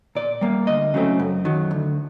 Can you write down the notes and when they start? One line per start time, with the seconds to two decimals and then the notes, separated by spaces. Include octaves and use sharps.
0.15 A#2 D5
0.41 G3 A#3
0.67 D2 D#5
0.94 C#3 F#3 A3 C4
1.20 F#2
1.45 D#3 F#3
1.71 D2